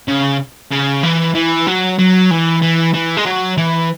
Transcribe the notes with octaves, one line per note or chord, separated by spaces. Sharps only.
C#3
C#3
E3
E3
F#3
F#3
E3
E3
E3
G#3
F#3
E3